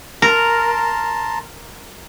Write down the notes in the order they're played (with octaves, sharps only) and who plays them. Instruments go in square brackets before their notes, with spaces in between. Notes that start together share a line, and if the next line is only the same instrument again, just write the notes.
[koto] A#4 [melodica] A5 A#5 C6